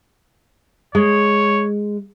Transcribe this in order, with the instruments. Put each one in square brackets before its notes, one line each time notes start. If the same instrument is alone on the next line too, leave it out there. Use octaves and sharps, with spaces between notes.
[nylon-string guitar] G#3 [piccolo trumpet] C#5